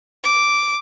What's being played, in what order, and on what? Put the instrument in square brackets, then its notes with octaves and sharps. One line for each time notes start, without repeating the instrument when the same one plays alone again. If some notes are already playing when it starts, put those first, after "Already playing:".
[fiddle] D6